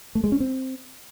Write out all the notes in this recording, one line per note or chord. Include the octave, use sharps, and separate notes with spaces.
A3
G#3
C#4
C4